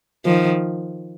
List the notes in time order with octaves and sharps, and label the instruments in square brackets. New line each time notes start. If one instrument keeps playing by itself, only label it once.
[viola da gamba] D#3 F3